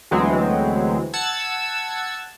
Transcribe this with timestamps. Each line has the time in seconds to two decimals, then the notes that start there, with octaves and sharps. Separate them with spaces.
0.11 D2 E3 F#3 G#3 B3 C4
1.13 F#5 A5 E6 G#6